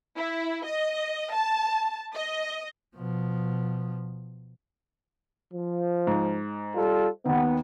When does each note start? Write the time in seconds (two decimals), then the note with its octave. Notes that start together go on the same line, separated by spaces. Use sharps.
0.16 E4
0.66 D#5
1.33 A5
2.15 D#5
2.96 B2 F3
5.53 F3
6.07 G#2
6.75 G3 F4 A4
7.26 D#2 D#3 B3